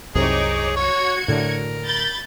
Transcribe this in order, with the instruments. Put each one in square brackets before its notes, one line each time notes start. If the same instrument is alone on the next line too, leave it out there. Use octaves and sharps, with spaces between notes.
[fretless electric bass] C2 F#2 C3 [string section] D#4 C#5 D6 [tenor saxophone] G#4
[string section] F#4 G#6 C#7 [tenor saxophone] C#5
[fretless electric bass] A2 D3 [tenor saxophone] A#4
[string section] B5 G6 A6